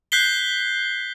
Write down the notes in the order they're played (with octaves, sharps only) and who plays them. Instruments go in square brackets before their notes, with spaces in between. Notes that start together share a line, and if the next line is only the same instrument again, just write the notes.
[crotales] F#6 G6 B6 C7 G7